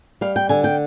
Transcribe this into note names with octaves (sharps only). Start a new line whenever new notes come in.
G3 F5
G5
D3 G#5
G5